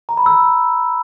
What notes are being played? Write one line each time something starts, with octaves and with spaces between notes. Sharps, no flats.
A#5
B5
E6